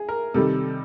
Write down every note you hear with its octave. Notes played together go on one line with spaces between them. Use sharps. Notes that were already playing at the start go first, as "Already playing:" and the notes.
Already playing: G#4
A#4
C3 D#3 G3 A4